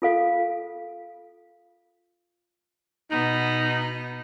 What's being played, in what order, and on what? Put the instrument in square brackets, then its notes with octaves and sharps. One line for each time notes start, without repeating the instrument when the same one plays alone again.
[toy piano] F4 A4 F5
[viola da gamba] B2 B3 [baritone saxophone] D#4